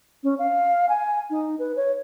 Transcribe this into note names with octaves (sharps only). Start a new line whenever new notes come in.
C#4
F5
G#5
D#4
B4
C#5